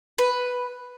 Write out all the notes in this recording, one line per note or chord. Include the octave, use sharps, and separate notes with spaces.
B4